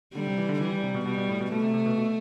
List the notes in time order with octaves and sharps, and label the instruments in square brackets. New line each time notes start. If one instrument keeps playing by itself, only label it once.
[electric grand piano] D3 [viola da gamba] G3
[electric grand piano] C3
E3
D3
[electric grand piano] E3 [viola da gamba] G3
[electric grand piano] E3
C3
B2
[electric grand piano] B2 [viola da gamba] G3
[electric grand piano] B2
A2
B2
[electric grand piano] B2 [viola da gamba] A3
[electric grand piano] C3
C3
B2
B2